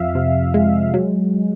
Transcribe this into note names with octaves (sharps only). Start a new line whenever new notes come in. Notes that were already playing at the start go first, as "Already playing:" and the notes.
Already playing: F2 F3 E5 F5
C3
G#3
F#3